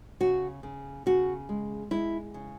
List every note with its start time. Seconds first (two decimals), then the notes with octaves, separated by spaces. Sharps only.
0.20 C#3 F#4
0.63 C#3
1.06 C#3 F#4
1.49 G#3
1.91 G#3 E4
2.34 C#3